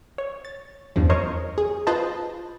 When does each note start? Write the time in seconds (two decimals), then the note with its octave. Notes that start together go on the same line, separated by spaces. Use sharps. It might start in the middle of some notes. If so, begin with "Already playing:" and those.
0.18 C#5
0.45 A6
0.96 E2 G2 C#3 F3
1.10 A#4 C5 C#5 D#5 C#6 F6
1.58 G#4
1.87 F4 B4 C5 D#5 A5